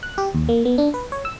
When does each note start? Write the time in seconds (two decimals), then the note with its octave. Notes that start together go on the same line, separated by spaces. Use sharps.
0.03 F#6
0.18 G4
0.35 D#2
0.49 A#3
0.65 B3
0.78 D4
0.94 B4
1.12 C#5
1.25 E6